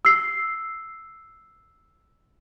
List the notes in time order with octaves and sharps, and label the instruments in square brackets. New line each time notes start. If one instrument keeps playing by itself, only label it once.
[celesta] E6 C7